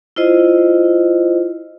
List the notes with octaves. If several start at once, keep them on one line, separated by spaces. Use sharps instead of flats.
E4 F4 C5 D#5